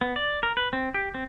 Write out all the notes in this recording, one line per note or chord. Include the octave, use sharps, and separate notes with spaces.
B3
D5
A#4
B4
C4
G4
C4